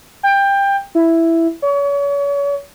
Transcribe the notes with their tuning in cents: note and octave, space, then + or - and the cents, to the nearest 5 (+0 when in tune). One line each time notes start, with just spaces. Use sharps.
G5 +20
E4 +5
C#5 +35